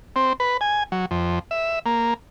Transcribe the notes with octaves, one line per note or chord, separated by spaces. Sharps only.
C4
B4
G#5
F#3
F2
E5
A#3